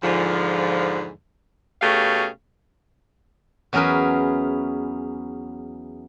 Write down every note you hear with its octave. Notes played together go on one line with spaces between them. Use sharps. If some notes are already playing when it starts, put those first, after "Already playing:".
E2 G#2 D3 F3
B2 A3 C#4 G4 G#4 F5
E2 F#3 C#4 G#4 A#4 B4